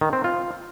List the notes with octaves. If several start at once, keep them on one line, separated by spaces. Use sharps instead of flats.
D#3
C4
F4